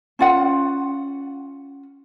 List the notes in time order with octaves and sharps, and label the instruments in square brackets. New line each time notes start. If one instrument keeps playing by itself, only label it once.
[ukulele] C#4 F4 F#5